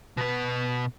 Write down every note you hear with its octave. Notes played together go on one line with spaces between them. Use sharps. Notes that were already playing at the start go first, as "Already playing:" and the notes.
B2 B4